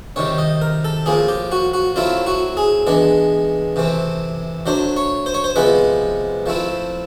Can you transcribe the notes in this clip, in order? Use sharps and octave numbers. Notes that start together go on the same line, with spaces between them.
C3 D#3 G3 C#5
D#5
A#4
A4
A2 F3 A#3 G#4
G4
F#4
F#4
F#3 A3 C4 E4 F4
F#4
G#4
E3 G#3 B3 D4
C3 E3 A3 C4
F#3 A3 D4 C5
C#5
C5
C#5
C5
C3 F3 G#3 B3 B4
F3 A3 C4 E4